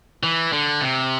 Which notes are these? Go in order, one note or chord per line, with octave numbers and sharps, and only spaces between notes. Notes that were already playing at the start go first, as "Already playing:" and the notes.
E3
D3
C3